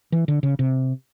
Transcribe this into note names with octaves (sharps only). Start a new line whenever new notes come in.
E3
D3
C#3
C3